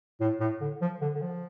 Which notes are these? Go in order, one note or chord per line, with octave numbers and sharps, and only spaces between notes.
A2
A2
D3
F3
D3
D3
F3